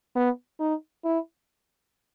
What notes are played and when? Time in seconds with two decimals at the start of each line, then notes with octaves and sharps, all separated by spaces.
0.16 B3
0.60 D#4
1.05 E4